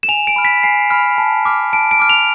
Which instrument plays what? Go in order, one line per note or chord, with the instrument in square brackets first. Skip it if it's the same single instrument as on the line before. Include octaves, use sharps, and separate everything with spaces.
[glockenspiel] E7
G#5 F7
D7
B5 F6
B6
G#5 C7
B5 F6
A5
D6 F6
A5 D7
D7
D6 F6
F7